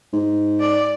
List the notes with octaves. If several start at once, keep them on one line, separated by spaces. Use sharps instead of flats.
G#2
D5